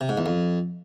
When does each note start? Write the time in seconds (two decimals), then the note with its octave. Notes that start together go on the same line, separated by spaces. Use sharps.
0.01 C3
0.09 G#2
0.17 E2
0.26 F2